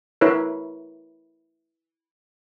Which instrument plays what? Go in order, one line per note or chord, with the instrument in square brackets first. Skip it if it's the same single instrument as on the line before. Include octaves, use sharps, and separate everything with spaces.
[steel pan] E4 A#4 B4 C#5